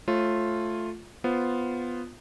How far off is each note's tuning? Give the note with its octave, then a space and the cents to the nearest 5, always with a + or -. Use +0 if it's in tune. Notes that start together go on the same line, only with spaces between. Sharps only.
A3 +0 F4 +0 C#5 -40
B3 +0 F4 +0 C5 +0